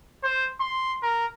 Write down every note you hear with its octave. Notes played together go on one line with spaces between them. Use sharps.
C5
C6
A#4